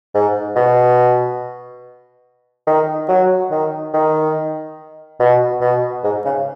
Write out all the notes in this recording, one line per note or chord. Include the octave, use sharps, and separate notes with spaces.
G#2
B2
D#3
F#3
D#3
D#3
B2
B2
G#2
C#3